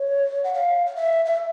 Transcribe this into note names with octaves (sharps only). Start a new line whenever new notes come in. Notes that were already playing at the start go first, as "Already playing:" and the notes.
Already playing: C#5
F#5
F5
F5
E5
E5